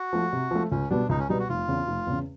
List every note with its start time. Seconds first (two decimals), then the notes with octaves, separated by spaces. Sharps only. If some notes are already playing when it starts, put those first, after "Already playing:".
Already playing: F#4
0.13 F3 A3
0.33 C3
0.51 F3 A3
0.71 C#2 C#4
0.90 B2 G3 B3 D4
1.09 C#2 D#4
1.19 C#4
1.29 B2 G3 B3 D#4
1.40 F#4
1.49 F1 F4
1.68 E2 C#3
1.87 F1
2.06 E2 C#3